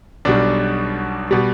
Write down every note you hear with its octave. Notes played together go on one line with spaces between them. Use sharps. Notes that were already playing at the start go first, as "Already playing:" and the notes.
B1 B2 G3 D4
B2 G3